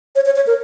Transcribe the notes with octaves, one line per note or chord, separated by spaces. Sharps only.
C#5
C#5
C#5
A#4